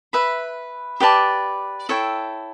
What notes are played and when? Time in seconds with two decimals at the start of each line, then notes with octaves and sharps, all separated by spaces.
0.13 B4 E5 B5
1.00 G4 B4 D5 A5
1.89 E4 A4 C#5 G5